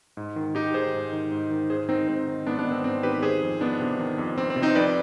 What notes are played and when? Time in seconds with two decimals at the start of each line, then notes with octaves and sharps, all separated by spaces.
0.17 G#2
0.36 D#3
0.55 G#2 D#4 G4
0.74 D#3 G#4 C5
0.94 G#2
1.13 D#3
1.32 G#2
1.51 D#3
1.70 G#2 G#4 C5
1.89 D#3 C4 D#4
2.08 G#2 C4
2.28 D#3
2.46 G#2 B3 D4
2.59 B3 D4
2.65 D#3
2.71 C4
2.84 G#2 C4
3.03 D#3 G4 B4
3.23 D#3 G#4 C5
3.42 F2
3.61 F2 B3 D4
3.80 C3
3.99 D#3
4.18 F2
4.37 F2 C4
4.50 C4
4.56 C3
4.62 C4 D#4
4.75 F2 B4 D5